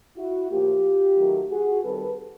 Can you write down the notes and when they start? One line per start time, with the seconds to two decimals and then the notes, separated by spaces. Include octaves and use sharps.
0.17 E4 F#4
0.50 A2 F3 A#3 F4 G4
1.17 D#3 F#3 A3
1.49 F#4 G#4
1.82 D#3 G3 C4 A4 B4